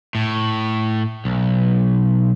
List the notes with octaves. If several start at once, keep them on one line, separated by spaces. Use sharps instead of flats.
A2
B1